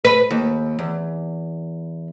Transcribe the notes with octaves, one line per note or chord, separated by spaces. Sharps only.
B4
D#2
E2